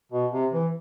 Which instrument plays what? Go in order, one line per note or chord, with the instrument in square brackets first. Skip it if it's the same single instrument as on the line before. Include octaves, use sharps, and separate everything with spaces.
[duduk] B2
C3
E3